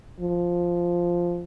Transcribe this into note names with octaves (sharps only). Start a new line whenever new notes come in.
F3